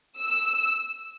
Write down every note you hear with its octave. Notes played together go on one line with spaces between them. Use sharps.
E6